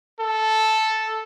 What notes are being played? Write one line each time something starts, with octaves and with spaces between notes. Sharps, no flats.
A4